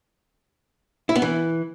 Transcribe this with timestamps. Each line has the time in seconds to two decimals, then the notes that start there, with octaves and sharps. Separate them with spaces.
1.09 E4
1.16 B3
1.22 E3